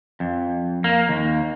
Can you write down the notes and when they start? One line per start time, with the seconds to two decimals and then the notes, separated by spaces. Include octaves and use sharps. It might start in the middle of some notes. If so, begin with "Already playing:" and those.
0.20 F2
0.84 A#3
1.09 D#2